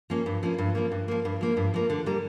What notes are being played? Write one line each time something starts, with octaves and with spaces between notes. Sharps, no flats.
F3 A#3 C#4
G2
F3 A#3 C#4
G2
F3 A#3
G2
F3 A#3
G2
F3 A#3
G2
F3 A#3
D3
G3 A#3